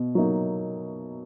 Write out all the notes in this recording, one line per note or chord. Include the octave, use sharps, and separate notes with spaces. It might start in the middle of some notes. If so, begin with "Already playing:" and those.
Already playing: B2
F#3 A#3 D#4